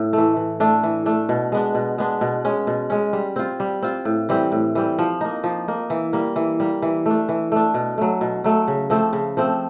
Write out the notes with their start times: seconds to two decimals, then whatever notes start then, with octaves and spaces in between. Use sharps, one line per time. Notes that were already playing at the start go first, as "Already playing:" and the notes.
Already playing: A2
0.13 E3 A3
0.37 E3
0.60 A3 D4
0.83 E3
1.06 A3 D4
1.29 B2
1.52 G#3 B3 D4
1.75 B2
1.98 G#3 B3 D4
2.21 B2
2.45 G#3 C#4
2.67 B2
2.90 G#3 C#4
3.13 G3
3.36 C4 F4
3.60 G3
3.83 C4 F4
4.05 A2
4.29 E3 G3 C4
4.52 A2
4.75 E3 G3 C4
4.99 F3
5.21 A#3 D#4
5.44 F3
5.68 A#3 D#4
5.90 E3
6.13 G3 A#3
6.36 E3
6.60 G3 A#3
6.82 E3
7.06 A3 D4
7.29 E3
7.52 A3 D4
7.74 B2
7.98 F#3 A3
8.21 B2
8.44 F#3 A3
8.68 C#3
8.90 F3 A3 C4
9.13 C#3
9.37 F3 A3 C4